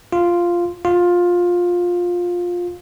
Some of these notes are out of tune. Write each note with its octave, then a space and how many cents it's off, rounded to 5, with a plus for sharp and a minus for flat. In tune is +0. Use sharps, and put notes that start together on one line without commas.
F4 -5
F4 +15